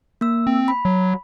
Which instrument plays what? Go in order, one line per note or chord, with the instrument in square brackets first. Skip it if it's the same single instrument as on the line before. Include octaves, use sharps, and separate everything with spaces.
[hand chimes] A#3 E6
[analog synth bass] C4
[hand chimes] B5
[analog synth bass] F#3